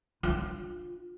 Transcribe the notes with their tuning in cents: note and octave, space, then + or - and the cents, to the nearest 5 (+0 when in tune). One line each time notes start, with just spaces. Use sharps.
D4 +30 F4 +25